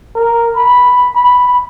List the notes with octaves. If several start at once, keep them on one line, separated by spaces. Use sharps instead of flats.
A#4
B5
B5